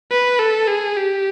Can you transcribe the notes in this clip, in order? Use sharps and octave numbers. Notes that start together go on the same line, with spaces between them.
B4
A4
G#4
G4